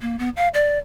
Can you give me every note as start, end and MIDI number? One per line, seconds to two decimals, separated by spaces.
0.01 0.19 58
0.19 0.29 59
0.36 0.48 77
0.54 0.78 74